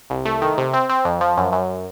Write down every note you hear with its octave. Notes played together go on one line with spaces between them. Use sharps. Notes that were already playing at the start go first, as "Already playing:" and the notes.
C2
A3
D#3
C3
C4
C4
F2
F3
F#2
F#2